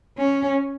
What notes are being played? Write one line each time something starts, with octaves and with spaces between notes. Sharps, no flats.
C#4